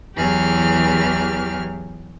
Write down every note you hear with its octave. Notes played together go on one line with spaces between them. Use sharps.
E2 E3 F#3 G4 G#4 F6